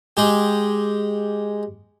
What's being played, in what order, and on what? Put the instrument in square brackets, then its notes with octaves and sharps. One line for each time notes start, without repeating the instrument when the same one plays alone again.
[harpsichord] G#3 G4